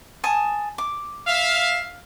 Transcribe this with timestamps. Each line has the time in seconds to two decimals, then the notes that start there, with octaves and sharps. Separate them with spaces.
0.24 G#5 A5 D#6
0.78 D6
1.27 E5 F5